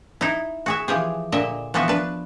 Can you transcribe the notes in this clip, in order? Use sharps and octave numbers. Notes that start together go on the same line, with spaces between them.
D#4 E4
F#4 G#4 E5
E3 F3 G4 G#4
A#2 D3 D#5 E5
E3 F3 B3 F#4 B4 E5
D4 B4